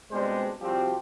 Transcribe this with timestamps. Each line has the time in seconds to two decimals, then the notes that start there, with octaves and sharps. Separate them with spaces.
0.11 B2 G3 G#3 C4 D4 C5
0.62 C2 F3 G3 C4 F#4 G4